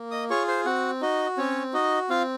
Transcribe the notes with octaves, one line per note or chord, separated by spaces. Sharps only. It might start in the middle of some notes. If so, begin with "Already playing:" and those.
Already playing: A#3
D#5 D#6
F4 G#4 C#5 C#6
C5 C6
C4 F#4 F#5
D#4 F#4 D#5
C4 C#4 C#5
D#4 F#4 D#5
C4 F4 F5